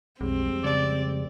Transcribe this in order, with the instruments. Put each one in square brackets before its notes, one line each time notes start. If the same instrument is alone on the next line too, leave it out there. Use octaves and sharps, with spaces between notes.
[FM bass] B1 [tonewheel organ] F2 G3 G#3 [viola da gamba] C4
[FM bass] C#3 [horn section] D5